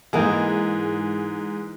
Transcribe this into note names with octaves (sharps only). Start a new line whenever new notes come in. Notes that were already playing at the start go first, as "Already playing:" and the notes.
G#2 E3 A#3 D#4 G#4